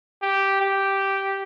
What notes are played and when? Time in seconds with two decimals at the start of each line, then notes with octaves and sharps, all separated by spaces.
0.22 G4
0.61 G4